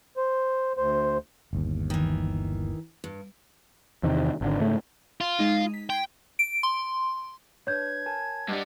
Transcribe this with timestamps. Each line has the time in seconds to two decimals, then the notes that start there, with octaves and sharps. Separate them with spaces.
0.17 C5
0.77 D2 C5
1.53 G1 D#2
1.90 D#3 E3
3.04 G2
4.03 E2 C3 D#3
4.41 G#1 D3
4.60 G#2 C#3 A3
5.21 F4
5.39 G#3 D#4
5.74 B6
5.90 G5 C6 G#6 C7
6.39 D7
6.63 C6
7.67 D4 B4 C#5 G6 G#6
8.06 A#4 G#5 A5
8.49 G2 G3 D#5 F#5 D6